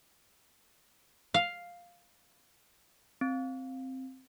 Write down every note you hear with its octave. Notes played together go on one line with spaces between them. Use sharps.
F5
C4